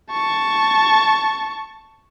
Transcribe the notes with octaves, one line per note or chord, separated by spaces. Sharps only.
A5 C#6